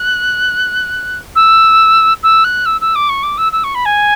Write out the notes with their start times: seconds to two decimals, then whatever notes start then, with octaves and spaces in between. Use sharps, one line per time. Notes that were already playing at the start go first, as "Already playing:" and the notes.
Already playing: F#6
1.36 E6
2.23 E6
2.44 F#6
2.66 E6
2.81 E6
2.95 D6
3.09 C#6
3.23 D6
3.38 E6
3.52 E6
3.64 C#6
3.75 B5
3.85 G#5